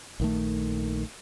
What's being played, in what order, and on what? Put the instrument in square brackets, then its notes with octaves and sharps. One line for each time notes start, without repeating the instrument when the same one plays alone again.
[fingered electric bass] A#1 D#3 A3